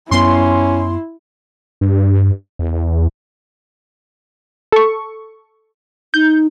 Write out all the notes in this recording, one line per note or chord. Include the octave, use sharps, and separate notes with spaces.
F#2 B3 C#4 E4 C6
G2
E2
A4 C#6
D#4 G6